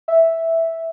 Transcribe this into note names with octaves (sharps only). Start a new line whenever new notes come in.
E5